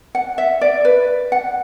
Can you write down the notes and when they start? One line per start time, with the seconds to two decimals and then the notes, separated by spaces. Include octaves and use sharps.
0.15 F#5
0.38 E5
0.61 D5
0.85 B4
1.32 F#5